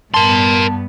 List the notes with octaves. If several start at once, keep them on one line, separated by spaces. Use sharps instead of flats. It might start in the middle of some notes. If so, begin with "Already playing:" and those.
G2 B3 A#4 A5 C6